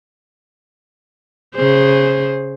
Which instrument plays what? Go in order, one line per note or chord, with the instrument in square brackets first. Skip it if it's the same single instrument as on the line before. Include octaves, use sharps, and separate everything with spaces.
[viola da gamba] C#3 G#4 C5